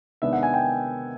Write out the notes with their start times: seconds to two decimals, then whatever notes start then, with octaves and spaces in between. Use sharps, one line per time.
0.22 C3 D#3 G#3 B3 D4 E5
0.33 F#5
0.43 G#5
0.54 G5